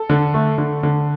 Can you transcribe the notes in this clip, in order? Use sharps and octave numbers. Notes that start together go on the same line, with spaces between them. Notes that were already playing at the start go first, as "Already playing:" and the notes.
Already playing: A4
D3
A3
D3
D3